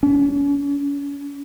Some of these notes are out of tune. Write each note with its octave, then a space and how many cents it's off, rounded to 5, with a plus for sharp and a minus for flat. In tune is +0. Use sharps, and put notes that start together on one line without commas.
C#4 +40